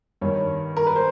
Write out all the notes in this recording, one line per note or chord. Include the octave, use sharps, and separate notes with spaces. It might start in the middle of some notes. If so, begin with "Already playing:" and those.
G2 D#3 C#5
A#4
B4
C5